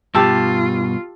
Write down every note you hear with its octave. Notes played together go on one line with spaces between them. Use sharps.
G2 B2 F4 G4 A5 E6